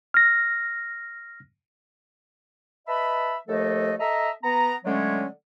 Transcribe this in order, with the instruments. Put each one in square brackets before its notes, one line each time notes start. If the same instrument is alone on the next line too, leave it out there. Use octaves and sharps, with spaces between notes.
[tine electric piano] F6 A#6
[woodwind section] B4 D#5 E5 A5 B5
D#2 F3 A3 A4 D#5
A4 D#5 E5 A#5
B3 A#5
D3 F#3 G#3 A3 C#4